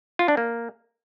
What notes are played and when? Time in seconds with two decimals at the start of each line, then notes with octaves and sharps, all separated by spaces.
0.19 F4
0.28 D4
0.37 A#3